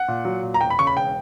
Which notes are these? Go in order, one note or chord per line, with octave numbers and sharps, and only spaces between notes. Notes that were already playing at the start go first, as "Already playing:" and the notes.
Already playing: F#5
A#2
F#3
A#2
A#5
E1 G5
B5
C#3 C#6
B5
E1 G5